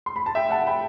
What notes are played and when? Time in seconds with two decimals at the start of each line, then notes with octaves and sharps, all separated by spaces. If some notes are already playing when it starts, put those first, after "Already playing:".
0.06 C6
0.16 B5
0.26 A5
0.35 E5 G5
0.50 F#5 A5
0.67 G5 B5